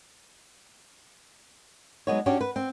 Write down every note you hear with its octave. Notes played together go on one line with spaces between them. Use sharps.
F#3 G#3 B3 D#4 C#5
C#4 D4 F#4 G4 C#5
B4
C4